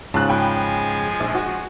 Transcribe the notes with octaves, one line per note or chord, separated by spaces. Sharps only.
G#2 C#3 F4 A5 F#6
F3 G#3 G5 G#5 B5
A#1
F#4